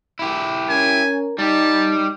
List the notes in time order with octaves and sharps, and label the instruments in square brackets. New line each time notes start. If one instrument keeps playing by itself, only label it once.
[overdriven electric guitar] E4 G4
[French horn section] C#4 A#4 [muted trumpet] G#5
[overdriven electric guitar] G3 G4 [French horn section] D#4 [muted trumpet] A5